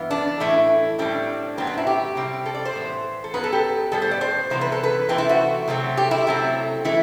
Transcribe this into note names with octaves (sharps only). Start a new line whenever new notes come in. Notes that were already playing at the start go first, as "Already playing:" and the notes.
Already playing: G2 E3 B3
D4
A2 E3 A3 E4
A2 G3 C4 D4
A2 F#3 B3 C4
D4
E4
G4
C3 G3 C4
A4
D5
C5
A2 E3 B3
A4
G2 F#3 B3 B4
A4
G4
A2 G3 B3 A4
C5
D5
C5
C3 E3 B3 C5
B4
A4
B4
C3 E3 A3 C4
E4
F#4
C3 F#3 A3 C4
G4
E4
C3 F#3 A3 C4
E3 A3 E4